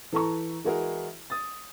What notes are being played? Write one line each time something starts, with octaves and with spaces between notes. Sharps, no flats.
E3 A4 A5 A#5 C#6
E3 G#3 E4 F#4 G#4 A#4
D#6 A6